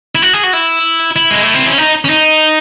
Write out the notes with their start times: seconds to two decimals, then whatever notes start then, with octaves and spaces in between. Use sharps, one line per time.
0.15 E4
0.22 F#4
0.33 G#4
0.43 F#4
0.53 E4
1.16 E4
1.31 G#3
1.43 A3
1.54 C4
1.67 C#4
1.78 D#4
2.05 C#4
2.10 D#4